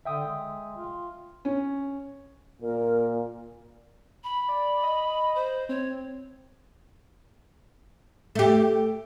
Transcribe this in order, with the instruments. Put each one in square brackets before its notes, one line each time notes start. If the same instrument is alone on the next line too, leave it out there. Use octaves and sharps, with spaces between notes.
[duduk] D3 [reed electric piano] E5 G5 D#6
[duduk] G#3
F4
[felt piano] C#4
[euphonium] A#2 [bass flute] A#4
[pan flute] B5
[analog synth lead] D5
D#5
[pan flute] C5
[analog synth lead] C4 [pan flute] C#5
[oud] A3 G4